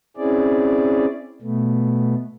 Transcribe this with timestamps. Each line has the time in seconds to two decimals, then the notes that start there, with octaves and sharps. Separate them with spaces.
0.17 C4 C#4 E4 G#4 D5
1.42 B2 A3 B3